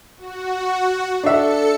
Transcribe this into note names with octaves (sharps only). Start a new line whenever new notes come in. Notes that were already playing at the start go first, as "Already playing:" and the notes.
F#4
D4 A4 E5 C#7